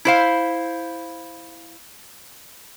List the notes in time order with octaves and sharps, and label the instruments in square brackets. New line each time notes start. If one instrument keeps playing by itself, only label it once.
[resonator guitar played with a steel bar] E4 C5 F5